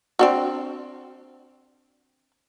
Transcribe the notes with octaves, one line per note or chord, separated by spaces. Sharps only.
C4 D4 F#4